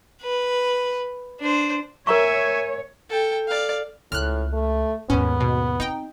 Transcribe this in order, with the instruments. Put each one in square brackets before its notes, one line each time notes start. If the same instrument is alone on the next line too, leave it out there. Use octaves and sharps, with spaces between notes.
[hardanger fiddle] B4
D4 C5
[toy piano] A#4 A#5 C#6 [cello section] C#5 [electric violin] E5 G#5
[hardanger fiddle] A4 G5
D5 F5
[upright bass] C#2 [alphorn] A2 [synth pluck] F6 F#6
[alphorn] A3
[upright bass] D#2 G#2 [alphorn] B3 [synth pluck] C#4
[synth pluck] B2
[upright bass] C4 [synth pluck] D#4 G5